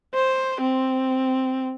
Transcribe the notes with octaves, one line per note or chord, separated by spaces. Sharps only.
C5
C4